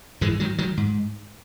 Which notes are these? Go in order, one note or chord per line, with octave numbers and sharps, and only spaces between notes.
G#2 E3 G#3
D#3 F#3
D#3 F#3
G#2